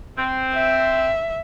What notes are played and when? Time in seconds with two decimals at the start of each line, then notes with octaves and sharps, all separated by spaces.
0.18 C4
0.55 E5